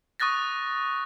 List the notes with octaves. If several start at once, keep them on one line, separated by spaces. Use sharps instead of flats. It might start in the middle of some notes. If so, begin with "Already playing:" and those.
C#6 D#6 F#6 A6 A#6